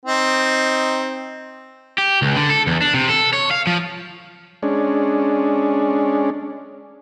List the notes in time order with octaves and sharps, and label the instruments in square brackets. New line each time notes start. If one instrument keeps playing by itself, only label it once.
[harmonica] C4 D#4
[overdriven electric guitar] G4
C#2
D3
A4
E2
D4
C3
A4
C#5
F5
F3
[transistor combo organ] G#3 C#4 D4